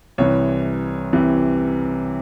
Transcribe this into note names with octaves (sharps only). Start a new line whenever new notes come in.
C2 C3 E3 C#5
C2 C3 E3